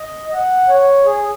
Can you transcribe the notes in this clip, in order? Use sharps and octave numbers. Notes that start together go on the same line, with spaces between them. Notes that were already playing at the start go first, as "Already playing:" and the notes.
Already playing: D#5
D#5
F#5
C#5
G#4